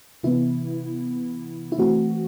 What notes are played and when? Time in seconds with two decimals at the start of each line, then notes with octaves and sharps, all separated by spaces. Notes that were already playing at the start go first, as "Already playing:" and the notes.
0.23 C3 E3 B3 E4
1.72 E4
1.78 E3 A3 C4 F#4